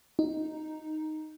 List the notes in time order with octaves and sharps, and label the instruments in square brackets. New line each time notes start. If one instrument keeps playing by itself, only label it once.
[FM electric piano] D#4